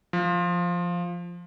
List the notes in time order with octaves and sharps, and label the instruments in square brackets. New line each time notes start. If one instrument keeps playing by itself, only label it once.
[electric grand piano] F3